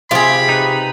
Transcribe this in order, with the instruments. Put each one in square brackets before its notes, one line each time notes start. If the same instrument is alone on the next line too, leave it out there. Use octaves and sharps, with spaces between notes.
[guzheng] C3 F4 [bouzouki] G4 G#4 [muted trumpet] B5
[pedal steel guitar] D#4 B4